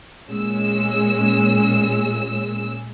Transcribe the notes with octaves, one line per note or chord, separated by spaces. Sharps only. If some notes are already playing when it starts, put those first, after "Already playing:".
A#2 G#3 C#4 E6